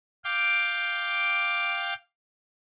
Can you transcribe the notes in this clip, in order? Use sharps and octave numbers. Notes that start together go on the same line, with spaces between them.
F5 G5 D6